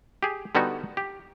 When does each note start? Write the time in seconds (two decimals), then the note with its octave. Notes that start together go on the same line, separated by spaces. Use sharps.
0.23 G4 G#4
0.55 D3 G3 B3 D#4 F#4
0.97 G4